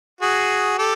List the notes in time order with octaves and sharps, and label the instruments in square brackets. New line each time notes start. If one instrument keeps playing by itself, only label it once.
[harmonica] F#4 G#4
G4 A4